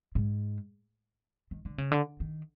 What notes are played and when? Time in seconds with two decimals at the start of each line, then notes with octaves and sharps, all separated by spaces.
0.15 G#2
1.51 D#3
1.65 D3
1.78 C#3
1.92 D3
2.20 D#3